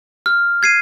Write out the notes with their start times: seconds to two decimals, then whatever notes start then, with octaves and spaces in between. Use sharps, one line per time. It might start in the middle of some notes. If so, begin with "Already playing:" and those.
0.26 F6
0.63 G#6 C7 D#7